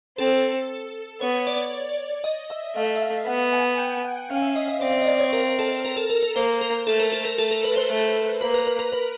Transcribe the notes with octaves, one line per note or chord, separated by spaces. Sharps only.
C4 A4
B3 C#5
D5
D#5
E5
A3 F5
E5
F5
B3 F#5
G#5
G5
F#5
C#4 F5
E5
D#5
D#5
C4 D5
D#5
D5
C#5
A#4
A4
A#4
A4
A#4
A#4
A#3 C5
A#4
A3 A4
A#4
A4
A#4
A3 A4
A#4
B4
C5
A3
A#3 B4
A#4
B4
A#4
B4